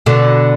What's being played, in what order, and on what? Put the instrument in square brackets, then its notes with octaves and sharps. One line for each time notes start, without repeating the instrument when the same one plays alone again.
[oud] B2 D3